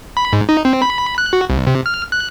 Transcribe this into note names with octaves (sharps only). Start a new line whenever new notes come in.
B5
G#2
D#4
C4
B5
F#6
F#4
C2
C3
F6
F#6